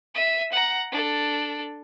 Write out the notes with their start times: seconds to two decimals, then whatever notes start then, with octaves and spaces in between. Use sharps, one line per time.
0.15 E5 D#7
0.52 F#5 A#5
0.92 D4 A4